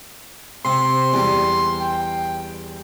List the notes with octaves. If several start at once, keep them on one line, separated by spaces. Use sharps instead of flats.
C3 C6
E2 G3
G5